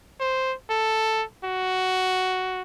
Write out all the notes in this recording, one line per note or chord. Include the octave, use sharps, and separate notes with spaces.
C5
A4
F#4